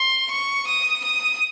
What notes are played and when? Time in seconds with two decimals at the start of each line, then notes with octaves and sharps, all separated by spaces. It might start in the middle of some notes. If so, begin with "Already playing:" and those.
Already playing: C6
0.31 C#6
0.68 D#6
1.04 D#6